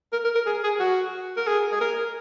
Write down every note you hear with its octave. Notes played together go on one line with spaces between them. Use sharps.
A#4
A#4
A#4
G#4
G#4
F#4
A#4
G#4
G#4
A#4